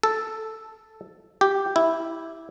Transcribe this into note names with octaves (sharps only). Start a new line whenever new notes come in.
A4
G4
E4